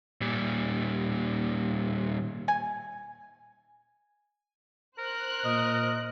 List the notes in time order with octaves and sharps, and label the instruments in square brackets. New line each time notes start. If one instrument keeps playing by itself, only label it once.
[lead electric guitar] A#2 G3
[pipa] G#5
[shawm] A#4 [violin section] C5 F#6
[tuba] A#2 [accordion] D#5 D#6